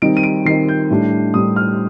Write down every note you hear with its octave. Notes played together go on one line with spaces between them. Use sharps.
D#3 G3 C4 D#4 D7
D#7
D7
D#3 G3 C4 D#4 C7
G6
A2 G3 D4
A2 G3 D4 D#6
F6